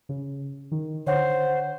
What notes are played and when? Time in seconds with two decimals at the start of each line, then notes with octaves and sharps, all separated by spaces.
0.09 C#3
0.72 D#3
1.06 D3 C5 C#5 F#5